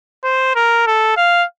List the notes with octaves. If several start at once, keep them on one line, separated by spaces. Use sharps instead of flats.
C5
A#4
A4
F5